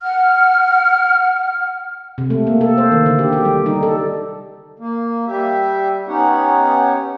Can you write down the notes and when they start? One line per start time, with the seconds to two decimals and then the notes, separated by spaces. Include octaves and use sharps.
0.02 F#5 F6
2.18 C3
2.30 A3
2.47 A#3
2.61 A4
2.78 C5
2.91 D#3
3.06 D3
3.19 G4
3.33 G4
3.45 G3
3.66 D#4
3.83 A4
4.79 A#3
5.28 G3 G4 E5
6.08 B3 C#4 D#4 G4 C#5 F#5